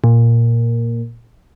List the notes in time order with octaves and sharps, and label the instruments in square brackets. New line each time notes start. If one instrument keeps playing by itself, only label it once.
[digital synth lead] A#2